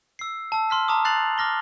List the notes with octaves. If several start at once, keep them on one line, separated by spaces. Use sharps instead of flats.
E6 C7
A5 E6
C6 F6 B6
A5 A#5 C6 D6 D#6
F#6 A6 C7 F7 F#7
D6 F6 A#6 G7